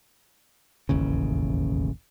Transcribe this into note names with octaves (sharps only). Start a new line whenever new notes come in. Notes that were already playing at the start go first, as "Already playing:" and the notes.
E1 A1 D#2 C#3